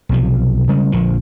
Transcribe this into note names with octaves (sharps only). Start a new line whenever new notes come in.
B1 C3 F3
C#3 G3 G#3
A#1 D3 F3